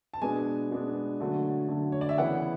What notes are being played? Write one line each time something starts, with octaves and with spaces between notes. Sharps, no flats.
A5
B2 G#3 B3 D4 G#5
B2 G#3 B3 D4
D3 F#3 A3
D3 F#3 A3
C#5
D5
E5
C#3 E3 B3 E4 F#5